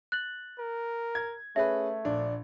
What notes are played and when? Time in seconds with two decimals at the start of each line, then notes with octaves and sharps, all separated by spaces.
0.12 F#6 A6 F#7
0.59 A#4
1.15 G#6
1.56 A3 C#4 G#4 B4 E5
2.05 A#1 D4